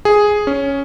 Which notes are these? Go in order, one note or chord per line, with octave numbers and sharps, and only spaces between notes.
G#4
C#4